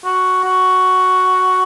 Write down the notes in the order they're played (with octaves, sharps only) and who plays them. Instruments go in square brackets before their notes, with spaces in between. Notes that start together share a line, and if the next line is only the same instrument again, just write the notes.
[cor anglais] F#4
F#4